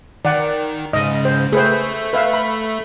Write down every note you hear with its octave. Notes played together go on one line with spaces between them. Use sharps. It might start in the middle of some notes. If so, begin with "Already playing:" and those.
D#3 D5 F#5
G#2 C#3 D#5
C5
A3 G#4 B4 C5
B4 E5 F5
B5